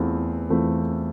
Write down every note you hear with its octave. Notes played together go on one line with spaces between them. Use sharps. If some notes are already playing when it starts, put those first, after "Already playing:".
Already playing: E2 E3 A3 C4 F4
E2 E3 A3 C4 F4